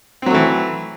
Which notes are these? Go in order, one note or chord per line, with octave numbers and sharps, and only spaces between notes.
E3 F#3 A3 C4